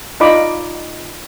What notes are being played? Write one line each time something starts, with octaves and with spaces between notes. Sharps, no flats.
D#4 F4 D5 D#5 B5 D6